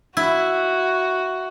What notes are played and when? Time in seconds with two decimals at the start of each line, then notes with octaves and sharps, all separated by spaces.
0.17 E4 F#4